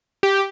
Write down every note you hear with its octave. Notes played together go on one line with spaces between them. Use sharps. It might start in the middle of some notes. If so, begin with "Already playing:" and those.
G4